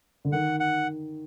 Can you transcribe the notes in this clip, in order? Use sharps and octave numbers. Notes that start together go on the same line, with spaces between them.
D3
D#3 F#5
F#5